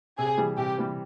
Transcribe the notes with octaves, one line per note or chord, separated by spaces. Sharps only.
C3 G#4
E3 G3
C3 G4
E3 G3